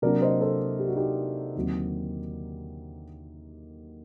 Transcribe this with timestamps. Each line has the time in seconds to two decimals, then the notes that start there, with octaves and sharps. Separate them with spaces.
0.02 C3 F#3 A#3 D4 A#4 D5
0.22 C5 D#5
0.41 A4 C5
0.79 G4
0.88 F#4
0.96 D#4 G4
1.56 D#2 D3 F#3 C4